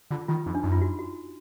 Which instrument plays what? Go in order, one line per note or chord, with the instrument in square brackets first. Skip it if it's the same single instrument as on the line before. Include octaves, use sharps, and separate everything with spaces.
[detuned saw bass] D3 [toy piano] F4
[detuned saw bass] D#3 [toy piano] F4
[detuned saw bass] F2 [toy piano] D#4
[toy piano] D4
[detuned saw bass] F#2 [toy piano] D#4
[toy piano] F4
F#4
F#4